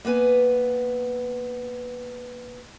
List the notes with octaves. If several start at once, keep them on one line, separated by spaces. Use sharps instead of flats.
A#3 B3 B4 G#5